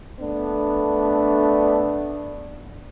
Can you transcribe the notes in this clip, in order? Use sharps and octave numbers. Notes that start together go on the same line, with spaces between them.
A3 B3 D4